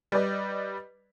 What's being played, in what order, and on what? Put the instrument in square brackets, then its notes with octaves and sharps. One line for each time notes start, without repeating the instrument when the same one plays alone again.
[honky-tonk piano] G3 B4 D5 D#5